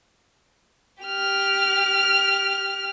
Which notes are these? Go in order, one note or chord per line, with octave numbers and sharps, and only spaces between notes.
G4 F6